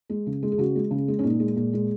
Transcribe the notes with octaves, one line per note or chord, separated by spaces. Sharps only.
G#3
C#3
G#3
G#4
C#3 F#4
G#3
C#3
G#3
C#4
A#2 D#4
G#3
A#2
G#3